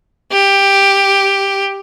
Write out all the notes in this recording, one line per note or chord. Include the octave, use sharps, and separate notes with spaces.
G4